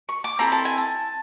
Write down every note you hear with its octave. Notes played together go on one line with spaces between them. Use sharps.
C#6
D6
C4 E4 A4 A#5
A5
G#5
A5